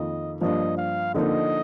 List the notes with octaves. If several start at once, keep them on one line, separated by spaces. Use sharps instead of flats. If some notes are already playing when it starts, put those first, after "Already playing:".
Already playing: F2 D#3 A#3 F4 D#5
G2 F3 A#3 D#5
F5
D3 F3 A#3 D#4 D#5